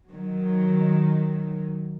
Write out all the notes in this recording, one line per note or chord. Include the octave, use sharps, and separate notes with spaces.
D#3 F#3